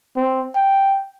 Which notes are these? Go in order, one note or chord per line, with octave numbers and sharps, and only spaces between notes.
C4
G5